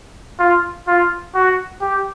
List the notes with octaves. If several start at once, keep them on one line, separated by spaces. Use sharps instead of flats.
F4
F4
F#4
G4